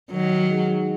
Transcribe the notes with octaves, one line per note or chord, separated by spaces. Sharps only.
D#3 F#3 G#3
D#4 G#4 D#5 F#5